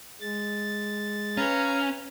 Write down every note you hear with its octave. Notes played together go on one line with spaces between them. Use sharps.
G#3 A6
C#4 B4 F5 G#5 A#5